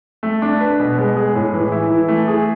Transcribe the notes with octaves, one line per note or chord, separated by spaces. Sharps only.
A3
D4
B4
B2
G#3
G#4
A2
E3
E4
E3
A3
G#4